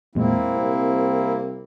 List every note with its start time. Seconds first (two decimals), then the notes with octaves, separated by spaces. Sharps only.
0.15 E2 A#2 G#3 A#3 C4 E4
0.55 C2